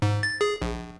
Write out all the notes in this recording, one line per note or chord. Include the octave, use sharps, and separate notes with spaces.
G#2
A6
G#4
A#1